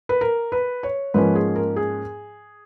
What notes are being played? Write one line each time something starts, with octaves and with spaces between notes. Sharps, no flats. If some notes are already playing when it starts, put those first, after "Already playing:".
B4
A#4
B4
C#5
G#2 F3 A#3 C#4 B4
G#4
A#4
G#4